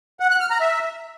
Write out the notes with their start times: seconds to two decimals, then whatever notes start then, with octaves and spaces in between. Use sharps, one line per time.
0.20 F#5
0.30 F#6
0.40 F6
0.50 A#5
0.60 E5